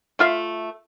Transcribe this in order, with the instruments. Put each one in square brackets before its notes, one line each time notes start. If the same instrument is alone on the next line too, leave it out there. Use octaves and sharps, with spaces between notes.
[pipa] A3 F4 E5 F5